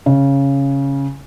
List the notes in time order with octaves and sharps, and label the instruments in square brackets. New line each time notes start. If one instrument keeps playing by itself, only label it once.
[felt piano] C#3